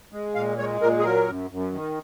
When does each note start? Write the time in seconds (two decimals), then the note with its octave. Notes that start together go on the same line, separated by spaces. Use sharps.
0.12 G#3
0.35 A#2 F5
0.58 G#3 C#5
0.81 A#2 A#4
0.99 G#4
1.03 F#3 A#4
1.27 F#2
1.51 F#2
1.72 D#3